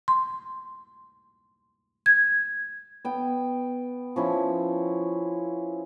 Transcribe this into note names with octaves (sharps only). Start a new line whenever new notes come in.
C6
G#6
B3 G5
F3 C#4 E4